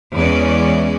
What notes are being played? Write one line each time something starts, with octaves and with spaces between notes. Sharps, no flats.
E2 E3 G#3 C#4 D5